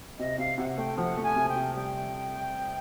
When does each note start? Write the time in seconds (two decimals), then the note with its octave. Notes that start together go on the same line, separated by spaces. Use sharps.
0.19 C3 D#5
0.38 C3 F5
0.58 C3 F#5
0.69 F#5
0.78 A3 G5
0.97 F3 F#5
1.17 A3
1.23 G#5
1.36 C3
1.49 G5
1.56 C3
1.75 G3 G5